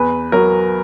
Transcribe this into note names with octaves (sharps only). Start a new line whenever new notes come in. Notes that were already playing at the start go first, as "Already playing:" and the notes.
Already playing: E2 B4
F#3 A#4